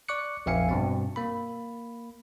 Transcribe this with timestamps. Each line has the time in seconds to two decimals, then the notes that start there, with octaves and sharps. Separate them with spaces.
0.09 D5 C#6 D6 F#6 C#7
0.46 A#1 F2 E5 F5 G#5 C#7
0.69 G2 B2 C4
1.16 A#3 B5